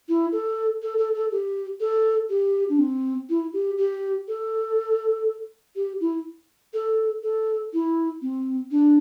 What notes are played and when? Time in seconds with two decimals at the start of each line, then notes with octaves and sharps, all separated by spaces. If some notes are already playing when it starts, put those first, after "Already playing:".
0.08 E4
0.32 A4
0.82 A4
0.98 A4
1.14 A4
1.31 G4
1.80 A4
2.29 G4
2.69 D4
2.79 C4
3.29 E4
3.53 G4
3.78 G4
4.28 A4
5.76 G4
6.00 E4
6.74 A4
7.23 A4
7.73 E4
8.22 C4
8.71 D4